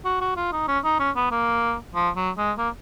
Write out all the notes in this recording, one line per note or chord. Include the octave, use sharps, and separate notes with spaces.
F#4
F#4
F4
D#4
C#4
D#4
C#4
B3
A#3
F3
F#3
G#3
A#3